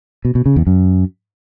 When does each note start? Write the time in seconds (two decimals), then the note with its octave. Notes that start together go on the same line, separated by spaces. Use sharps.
0.25 B2
0.35 B2
0.46 C#3
0.56 E2
0.67 F#2